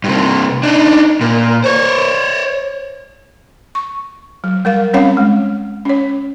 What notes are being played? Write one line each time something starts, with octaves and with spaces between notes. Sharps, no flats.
G2 C3
D4 D#4
A#2
C5 C#5
C#6
F#3
G3 A#4 F5
G3 C4 C#4 C#5 F5 F#5
G#3
C#4 C#5